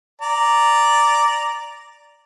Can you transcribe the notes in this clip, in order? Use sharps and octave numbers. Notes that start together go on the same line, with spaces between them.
D5 A#5